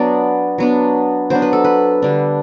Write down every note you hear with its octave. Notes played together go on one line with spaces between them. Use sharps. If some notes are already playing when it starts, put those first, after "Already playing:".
Already playing: F#3 B3 D4 D5
F#3 B3 D4
F#3 B3 D4 C5
B4
A4
B4
D3 G3 D4